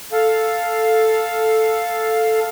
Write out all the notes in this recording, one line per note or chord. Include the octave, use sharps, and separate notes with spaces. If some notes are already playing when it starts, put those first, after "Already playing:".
A4 F5